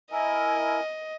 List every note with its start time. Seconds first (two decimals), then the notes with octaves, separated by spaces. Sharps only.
0.12 E4 A#4 D#5 G#5